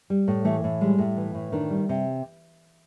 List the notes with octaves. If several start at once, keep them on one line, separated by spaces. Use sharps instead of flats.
G3
A2
E3 A3
A2
G3 G#3
A2
E3
A2
D#3 D4
G3
C3